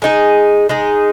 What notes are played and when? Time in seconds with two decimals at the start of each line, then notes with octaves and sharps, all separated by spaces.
0.02 G#3 D#4 G#4
0.69 G#3 D#4 G#4